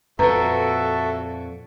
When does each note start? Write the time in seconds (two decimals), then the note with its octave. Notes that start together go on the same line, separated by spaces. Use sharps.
0.19 F2 A#2 F#4 A4 B4 E5 A#5